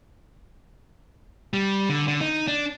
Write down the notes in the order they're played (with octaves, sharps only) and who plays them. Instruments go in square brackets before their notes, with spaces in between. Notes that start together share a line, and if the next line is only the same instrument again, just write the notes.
[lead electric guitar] G3
D3
D3
D#4
D4